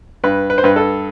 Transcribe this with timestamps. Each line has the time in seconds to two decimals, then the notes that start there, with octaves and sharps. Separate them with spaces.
0.24 G2 B4
0.50 B4
0.58 C5
0.64 G2 B4
0.76 A4